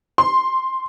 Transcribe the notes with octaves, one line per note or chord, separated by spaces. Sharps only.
C6